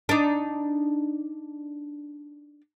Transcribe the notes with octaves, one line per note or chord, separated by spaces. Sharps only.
D4 D#4